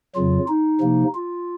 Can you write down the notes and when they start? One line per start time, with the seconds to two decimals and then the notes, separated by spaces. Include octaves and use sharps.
0.16 F2 C#3 F#3 F4
0.48 D#4
0.81 C3 F3 A#3
1.15 F4